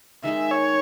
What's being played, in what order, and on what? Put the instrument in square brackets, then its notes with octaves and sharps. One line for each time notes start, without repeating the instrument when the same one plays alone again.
[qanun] D#3 G#3 D#4 G#4 [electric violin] E5
[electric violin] C#5